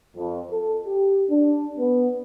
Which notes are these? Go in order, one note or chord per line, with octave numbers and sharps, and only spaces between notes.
F2
A4
G4
D4
B3